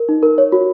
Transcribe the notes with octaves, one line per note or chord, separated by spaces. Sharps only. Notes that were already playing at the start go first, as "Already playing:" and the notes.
Already playing: A#4
D#4
A#4
C#5
F#4